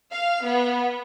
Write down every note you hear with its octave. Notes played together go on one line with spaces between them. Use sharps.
F5
B3